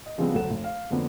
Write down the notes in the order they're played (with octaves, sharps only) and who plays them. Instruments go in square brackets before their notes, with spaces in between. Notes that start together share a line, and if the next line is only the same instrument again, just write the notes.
[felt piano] D#5
C#3 F3 G3 G#3 B3 C4
F1 D2 F#3 A4 F#5 E7
F1
F5
F2 D3 F3 A#3 B3